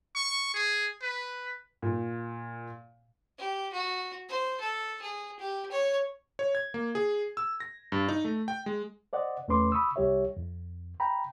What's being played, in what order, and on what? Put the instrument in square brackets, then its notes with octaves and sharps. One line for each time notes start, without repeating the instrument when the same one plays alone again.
[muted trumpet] C#6
G#4
B4
[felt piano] A#2
[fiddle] G4
F#4
C5
A4
G#4
G4
C#5
[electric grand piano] C#5
G#6
A#3
G#4
E6
A#6
G2
D#4
A3
G5
G#3
[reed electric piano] C5 D5 D#5 F#5
E2 A3 C#4 B4 C6 D6
B5 C#6 D#6 E6
C2 G3 G4 C#5 E5
F2
G5 A#5 B5